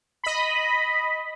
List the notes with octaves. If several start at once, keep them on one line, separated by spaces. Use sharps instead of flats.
D#5 B5